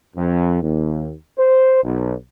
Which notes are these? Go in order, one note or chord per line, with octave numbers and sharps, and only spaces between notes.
F2
D#2
C5
B1